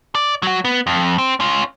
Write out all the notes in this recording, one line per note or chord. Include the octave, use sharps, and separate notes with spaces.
D5
F#3 F#4
B3
F2
C4
C#4 F4